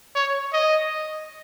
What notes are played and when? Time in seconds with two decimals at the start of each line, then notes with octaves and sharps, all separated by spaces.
0.15 C#5
0.53 D#5